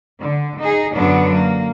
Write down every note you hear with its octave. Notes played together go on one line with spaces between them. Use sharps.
D3
D#4 G#4
F#2 D3 F#3 B3 D4
A#3